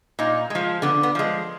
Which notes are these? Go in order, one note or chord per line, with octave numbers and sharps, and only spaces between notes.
A#2 D#4
F3 G#3
D3 B3
B3
F3 G#3